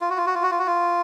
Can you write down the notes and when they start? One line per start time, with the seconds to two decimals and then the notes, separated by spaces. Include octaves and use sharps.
0.01 F4
0.10 F#4
0.17 F4
0.26 F#4
0.35 F4
0.43 F#4
0.51 F4
0.59 F#4
0.67 F4